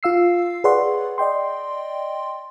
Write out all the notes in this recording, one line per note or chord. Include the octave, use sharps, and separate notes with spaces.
F4 F5 E6 C7
G#4 B4 C#5 D5 F#5 C6
D5 D#5 G5 C6